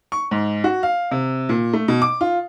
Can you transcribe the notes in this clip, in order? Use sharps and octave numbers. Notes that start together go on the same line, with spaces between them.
C#6
G#2
F#4
F5
C3
A#2
A3
B2
D6
F4